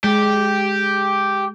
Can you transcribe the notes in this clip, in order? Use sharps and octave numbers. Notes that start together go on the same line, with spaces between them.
G#3 G4